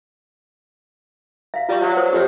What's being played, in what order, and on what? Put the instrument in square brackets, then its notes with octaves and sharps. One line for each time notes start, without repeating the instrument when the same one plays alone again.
[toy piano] E5 F5
[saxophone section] G3 [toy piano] F4 E5 C#6
[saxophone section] F#3
[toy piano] C5 D#6
[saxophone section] F2 [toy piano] G4 C#5